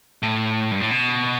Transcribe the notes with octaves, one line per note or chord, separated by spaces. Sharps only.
A2
G2
A2
B2